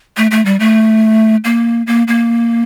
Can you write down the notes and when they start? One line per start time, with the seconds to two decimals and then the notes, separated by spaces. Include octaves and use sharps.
0.17 A3
0.31 A3
0.45 G3
0.60 A3
1.44 A#3
1.87 A#3
2.08 A#3